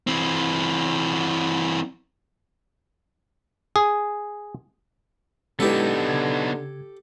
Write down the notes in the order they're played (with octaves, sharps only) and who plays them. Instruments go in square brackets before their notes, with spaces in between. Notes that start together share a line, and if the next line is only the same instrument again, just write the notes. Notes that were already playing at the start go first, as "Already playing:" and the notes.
[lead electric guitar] E3 C4
[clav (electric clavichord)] G#4
[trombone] D3 [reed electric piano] G#3 E4 B4 [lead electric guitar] B3 D#4 [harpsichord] G4 A4
[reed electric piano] C#3 G#6